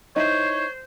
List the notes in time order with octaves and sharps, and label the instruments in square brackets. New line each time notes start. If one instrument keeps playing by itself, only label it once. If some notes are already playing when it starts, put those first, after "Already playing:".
[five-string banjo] D#4 E4 [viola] C5 [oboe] C#5